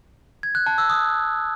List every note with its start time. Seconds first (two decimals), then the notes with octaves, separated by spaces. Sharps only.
0.43 G#6
0.55 F#6
0.66 A5
0.78 E6
0.90 D#6